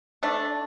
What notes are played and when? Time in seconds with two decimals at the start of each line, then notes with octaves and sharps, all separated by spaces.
0.23 A3 D4